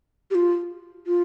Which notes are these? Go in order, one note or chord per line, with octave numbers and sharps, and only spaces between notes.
G4
F4
F4